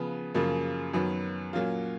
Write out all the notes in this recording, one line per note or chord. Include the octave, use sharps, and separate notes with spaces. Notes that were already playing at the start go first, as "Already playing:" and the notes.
Already playing: C#3 F3 B3
F#2 C#3 F3 A#3
F#2 D#3 F#3 B3
A#2 F#3 A#3 C#4 F4